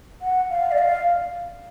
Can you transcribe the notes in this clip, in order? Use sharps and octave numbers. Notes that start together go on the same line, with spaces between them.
F#5
F5
D5
F5